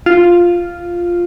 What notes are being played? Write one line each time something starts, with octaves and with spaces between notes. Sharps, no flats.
F4